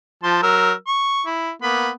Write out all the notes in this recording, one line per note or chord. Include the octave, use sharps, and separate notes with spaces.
F3 A5 C6
F#3 A#4 E6
C#6
E4
A#3 B3 B5